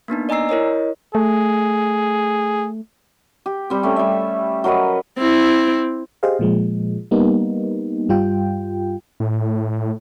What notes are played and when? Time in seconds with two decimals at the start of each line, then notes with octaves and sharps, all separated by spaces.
0.08 A#3 B3 D4 D#4
0.29 D5 D#5 G#5 A#5 E6 C7
0.49 E4 A#4 C#5 D#5
1.15 A3 G#4
3.46 G4
3.70 G3 C4
3.83 A3 C#4
3.96 G3 E5
4.64 F#3 A#4 B4 D#5
5.18 C4 E4
6.23 G4 G#4 C5 D#5 F5
6.39 A#2 F3 G#3
7.11 G3 A#3 B3 D#4
8.09 G2 G3 F4 G5
9.20 A2